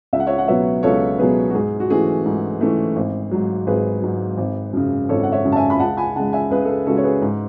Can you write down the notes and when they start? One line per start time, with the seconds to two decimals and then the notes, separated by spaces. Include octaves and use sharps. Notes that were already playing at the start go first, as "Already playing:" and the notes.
0.13 C#2 E5
0.20 F#5
0.27 C#5 E5
0.38 F#5
0.48 B2 F#3 B3 C#5 E5
0.83 C#2 A4 C#5
1.18 B2 F#3 B3 G#4 B4
1.50 F#4
1.54 G#2 G#4
1.80 F#4
1.90 E3 A3 C#4 G#4
2.26 G#2
2.60 E3 A3 C#4
2.96 G#1
3.31 G#2 F#3
3.67 G#1 G#4 B4
4.02 G#2 F#3
4.38 G#1
4.73 F#2 C#3
5.09 G#1 A4 C#5
5.23 F#5
5.32 C#5 E5
5.45 F#2 C#3
5.52 A5
5.56 E5 G#5
5.70 B5
5.79 C#2 F#5 A5
5.97 G#5 B5
6.16 C#3 G#3 F#5 A5
6.33 E5 G#5
6.51 C#2 G#4 B4
6.65 A4
6.69 G#4
6.87 C#3 G#3 F#4 A4
6.97 C#5
7.04 G#4 B4
7.22 G#2